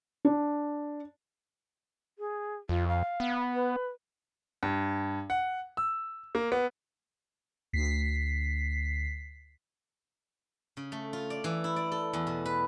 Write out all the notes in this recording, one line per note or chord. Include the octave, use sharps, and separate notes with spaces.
D4
G#4
F2 F4
F5
B3
B4
G2
F#5
E6
A#3
B3
D2 B6 C7
C#3
A3
F4
D5
E3
E4
D5
A4
E2
B2
B4